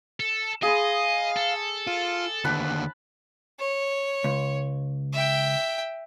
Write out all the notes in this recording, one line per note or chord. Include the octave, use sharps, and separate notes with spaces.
A4
G#4 D#5 F5 B5 C6
A4
F4
D#2 D3 B4 A5
C#5
C#2
E5 G5